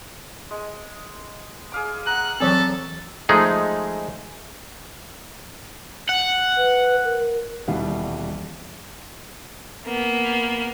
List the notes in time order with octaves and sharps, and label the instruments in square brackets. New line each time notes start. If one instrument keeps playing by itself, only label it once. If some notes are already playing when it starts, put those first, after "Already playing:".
[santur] G#3
G#4 F5 D6
[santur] F#5 A#5 [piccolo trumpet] F#6
[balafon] E3 F#3 C4 [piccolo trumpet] A4
[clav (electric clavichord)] F3 G#3 A3 D#4 G#4
[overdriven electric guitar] F#5
[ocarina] B4
A#4
[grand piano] D#1 B2 E3 G3 F#4 F5
[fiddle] A#3 B3